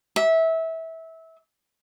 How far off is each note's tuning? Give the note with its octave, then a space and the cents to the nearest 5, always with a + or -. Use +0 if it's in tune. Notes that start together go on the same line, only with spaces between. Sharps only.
E5 -20